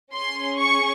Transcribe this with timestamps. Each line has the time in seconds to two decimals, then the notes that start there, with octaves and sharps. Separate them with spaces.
0.12 C#4 G#4 C6
0.59 C#6